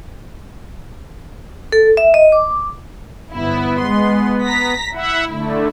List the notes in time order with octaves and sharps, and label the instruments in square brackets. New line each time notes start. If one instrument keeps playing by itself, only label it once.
[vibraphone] A4
E5
D#5
D6
[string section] G1 E4 [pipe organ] B3
[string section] G#3 C6
A#5 A#6 B6
[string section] E4 [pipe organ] E5 F#5
[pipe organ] D3 A3